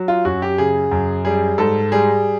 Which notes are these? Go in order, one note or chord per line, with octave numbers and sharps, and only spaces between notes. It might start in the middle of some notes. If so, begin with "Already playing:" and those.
Already playing: F#3
F4
F#2 F#4
G4
C#3 G#4
F#2
G3 G#4
G#2 A4
G3 G#4